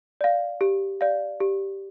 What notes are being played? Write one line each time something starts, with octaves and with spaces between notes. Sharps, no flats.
D5 F5
G4
D5 F5
G4